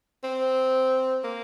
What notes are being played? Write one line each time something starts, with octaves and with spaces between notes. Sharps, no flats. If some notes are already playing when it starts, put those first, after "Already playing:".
C4
A#3